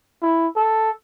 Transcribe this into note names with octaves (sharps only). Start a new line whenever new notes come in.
E4
A4